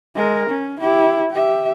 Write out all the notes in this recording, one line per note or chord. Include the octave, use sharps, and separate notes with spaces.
G#3 A#4
C#4
E4 G4
G4 E5